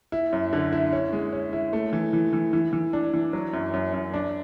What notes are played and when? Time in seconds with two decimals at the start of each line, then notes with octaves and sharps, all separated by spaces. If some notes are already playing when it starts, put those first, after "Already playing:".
0.12 E4
0.33 F#2
0.53 D3
0.72 E4
0.92 C#4
1.13 G#3
1.33 C#4
1.53 E4
1.73 A3
1.93 E3
2.13 E3
2.33 E3
2.53 E3
2.73 E3
2.93 D4
3.14 E3
3.33 F#3
3.53 F#2
3.74 F#2
3.93 F#2
4.14 D4